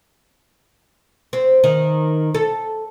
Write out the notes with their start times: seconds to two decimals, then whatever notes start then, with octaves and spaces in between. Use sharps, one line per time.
1.33 C4
1.64 D#3
2.34 A4